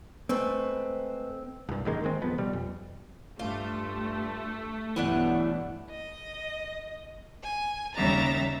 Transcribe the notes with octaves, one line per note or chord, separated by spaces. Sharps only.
G#3 A3 C4 B4
C2 G2
A1 D#3 G#3 A#3
D#3 G#3 C4
D#1 F2 F3 B3
B2 G3
F2
G2 A3 F4
B1 G2 E3 B3 D4 F#5
D#5
G#5
D#2 C#3 G3 E5 A#5 A6